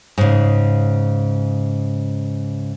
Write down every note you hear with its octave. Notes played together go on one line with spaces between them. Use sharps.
G#2 C#3